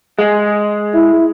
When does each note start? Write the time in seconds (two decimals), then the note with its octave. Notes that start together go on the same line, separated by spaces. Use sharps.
0.19 G#3
0.95 E4